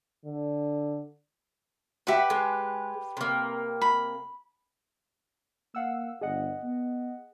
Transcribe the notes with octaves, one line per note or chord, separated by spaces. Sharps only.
D3
G4 B4 E5 F#5
G#3
C3 A#3
B5
A#3 F5 F#5 E6
G1 G#4 D#5 F#5
B3